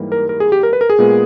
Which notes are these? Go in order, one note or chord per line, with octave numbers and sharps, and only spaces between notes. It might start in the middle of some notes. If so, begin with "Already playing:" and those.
Already playing: G#2 E3 G3 A#3
A#4
A#4
G#4
G4
A#4
B4
A#4
G#4
A#2 G#3 B3